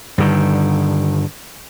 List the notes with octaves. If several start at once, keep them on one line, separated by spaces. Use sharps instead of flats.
G2 D3 D#3